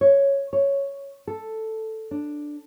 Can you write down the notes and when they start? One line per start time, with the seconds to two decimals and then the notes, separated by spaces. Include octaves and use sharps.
0.01 C#5
0.53 C#5
1.28 A4
2.11 D4